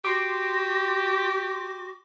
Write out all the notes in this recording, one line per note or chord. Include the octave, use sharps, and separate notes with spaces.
F#4 G4 C6 D6